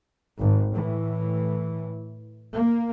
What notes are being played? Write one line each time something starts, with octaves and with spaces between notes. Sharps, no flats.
G#1
A2 E3
A#3